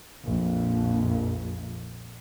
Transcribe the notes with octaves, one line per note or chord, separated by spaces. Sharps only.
A#1 F2